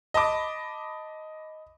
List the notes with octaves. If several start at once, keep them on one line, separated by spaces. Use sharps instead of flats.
D#5 A5 B5 D6